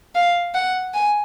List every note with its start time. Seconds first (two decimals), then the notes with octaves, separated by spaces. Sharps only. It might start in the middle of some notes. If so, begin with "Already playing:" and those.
0.15 F5
0.55 F#5
0.94 G#5